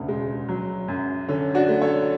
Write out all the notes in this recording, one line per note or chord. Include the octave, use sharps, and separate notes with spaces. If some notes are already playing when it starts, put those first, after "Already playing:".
Already playing: E1 D2 C#3
G#3
F#3
F#2
D3 C#4
D4 F#4
A3
A4 C#5